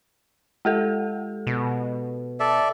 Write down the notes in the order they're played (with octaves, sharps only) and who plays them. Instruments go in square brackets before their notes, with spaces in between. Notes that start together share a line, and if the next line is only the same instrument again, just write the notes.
[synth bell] G#3 G4 A4
[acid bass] B2
[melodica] A4 D5 E5